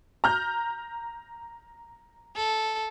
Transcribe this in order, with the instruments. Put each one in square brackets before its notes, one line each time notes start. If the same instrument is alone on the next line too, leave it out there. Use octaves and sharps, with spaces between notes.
[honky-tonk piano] A#5 F6 G6
[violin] A4